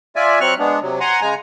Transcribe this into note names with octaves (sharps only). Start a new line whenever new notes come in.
F4 D5 E5 G#5
F#3 C4 C#6 F6 F#6
G#3 B3 D4
C3 F#3
F#5 G#5 A#5 C6
C#3 G#3 G#5 A#5